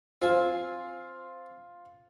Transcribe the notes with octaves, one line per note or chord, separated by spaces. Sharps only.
C4 F4 C5 F5 G#5